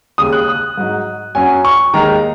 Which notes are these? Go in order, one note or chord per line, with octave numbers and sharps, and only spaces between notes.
D#2 C#3 G#3 D#6
F#6
D#6
G#2 F#3 D#4
F#2 F#3 C#4 G#5
C#6
D#2 D#3 G#3 D#4 A#5